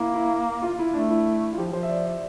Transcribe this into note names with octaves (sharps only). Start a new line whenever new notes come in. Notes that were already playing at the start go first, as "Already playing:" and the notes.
Already playing: A#3 E4
E4
F4
E4
A3 D4
E4
F4
F3 G4
F3 C5
E5
D5
D5